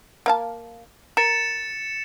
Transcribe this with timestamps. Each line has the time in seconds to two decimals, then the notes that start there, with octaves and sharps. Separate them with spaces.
0.26 A#3 F5 A5
1.17 A#4 A6 C#7 E7